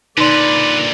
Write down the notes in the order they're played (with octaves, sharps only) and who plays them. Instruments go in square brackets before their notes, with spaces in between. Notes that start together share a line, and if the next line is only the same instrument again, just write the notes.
[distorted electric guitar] A#2 D3 [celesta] D#4 C6 [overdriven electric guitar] B4 [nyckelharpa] D5